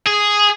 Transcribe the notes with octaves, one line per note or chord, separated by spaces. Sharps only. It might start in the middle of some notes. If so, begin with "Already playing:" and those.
G#4